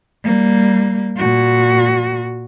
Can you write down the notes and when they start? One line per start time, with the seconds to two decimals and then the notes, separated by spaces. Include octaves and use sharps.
0.24 G3 A#3
1.17 A#2 F#4